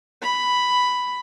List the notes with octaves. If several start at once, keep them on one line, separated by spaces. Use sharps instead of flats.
B5